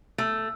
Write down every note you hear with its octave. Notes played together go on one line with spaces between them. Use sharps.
A3